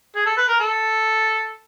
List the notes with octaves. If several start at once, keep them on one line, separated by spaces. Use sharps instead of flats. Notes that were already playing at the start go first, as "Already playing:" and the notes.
G#4
A4
B4
A#4
A4